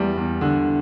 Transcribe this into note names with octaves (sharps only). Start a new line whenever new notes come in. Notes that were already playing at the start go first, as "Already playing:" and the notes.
Already playing: E2 G3
E2
D3